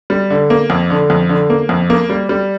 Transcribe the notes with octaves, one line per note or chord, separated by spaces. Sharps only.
G3
D3
A#3
F2
D3
F2
D3
A#3
F2
A#3
G3
G3